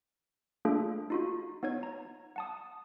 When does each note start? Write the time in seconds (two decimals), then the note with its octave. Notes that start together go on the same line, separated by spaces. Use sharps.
0.65 A3 A#3 D4 F4 G#4 A4
1.10 D#4 F4 F#4
1.63 B3 D#4 C#5 G#6
1.83 A#5
2.36 F#5 A5 D#6